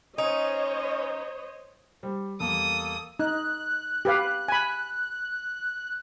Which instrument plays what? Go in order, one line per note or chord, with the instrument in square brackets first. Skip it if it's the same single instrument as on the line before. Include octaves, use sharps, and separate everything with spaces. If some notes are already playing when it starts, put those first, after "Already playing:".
[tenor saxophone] C#4 [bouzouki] D#4 [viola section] C5 C#5 D#5
[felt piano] G3 C5
[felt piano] E2 G3 [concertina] A#3 A4 E6 [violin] D#6
[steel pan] D#4 [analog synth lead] F#6
[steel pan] G4 B4 F5
G#5 B5